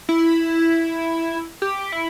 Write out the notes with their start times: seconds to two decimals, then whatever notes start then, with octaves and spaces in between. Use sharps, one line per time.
0.09 E4
1.62 G4
1.92 E4